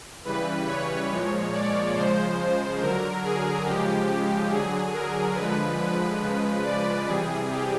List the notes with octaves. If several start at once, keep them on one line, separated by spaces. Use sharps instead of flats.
C#3 E3 G3 B4
C#5
A#2 F3 G#3
D5
C#3 F3 G#3 C5
D3 F#3 A#4
G#4
C#3 F3 G#3 G4
G4
D3 F#3 G#4
A#4
D3 F3 G#3 B4
B4
C#3 F3 G#3
D5
C3 E3 G3 G#4
G4